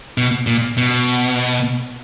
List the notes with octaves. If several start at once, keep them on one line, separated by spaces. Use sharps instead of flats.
B2
A#2
B2